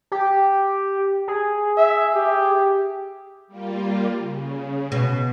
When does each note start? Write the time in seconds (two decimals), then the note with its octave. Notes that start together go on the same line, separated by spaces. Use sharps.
0.12 G4
1.28 G#4
1.77 E5
2.15 G4
3.48 G3 A#3 F4
4.18 C#3
4.92 B2